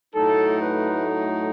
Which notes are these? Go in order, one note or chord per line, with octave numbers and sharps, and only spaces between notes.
A2 F#3 A3 D#4 A4
B4